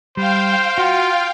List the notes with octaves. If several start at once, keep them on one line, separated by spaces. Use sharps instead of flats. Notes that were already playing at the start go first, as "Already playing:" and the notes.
G3 C5 F5 G5
F4 F#4